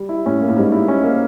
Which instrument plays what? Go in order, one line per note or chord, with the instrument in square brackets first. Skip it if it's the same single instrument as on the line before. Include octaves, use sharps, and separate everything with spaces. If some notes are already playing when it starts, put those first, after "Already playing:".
Already playing: [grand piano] G3
E4
[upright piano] A2 [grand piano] C#4
[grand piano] A#3
[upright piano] A2
[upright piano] G#2 [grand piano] G3
[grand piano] E4
C#4
A#3